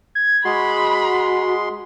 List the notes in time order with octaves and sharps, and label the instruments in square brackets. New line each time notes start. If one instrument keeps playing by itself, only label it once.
[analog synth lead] G#6
[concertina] G#3 C6 [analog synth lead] F#4 [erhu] B5